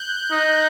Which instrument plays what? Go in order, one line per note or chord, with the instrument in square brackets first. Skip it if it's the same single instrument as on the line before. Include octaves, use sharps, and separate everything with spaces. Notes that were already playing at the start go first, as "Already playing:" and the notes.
Already playing: [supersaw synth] F#6 G6
[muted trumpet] D#4